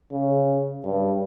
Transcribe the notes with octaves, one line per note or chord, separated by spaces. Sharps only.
C#3
G2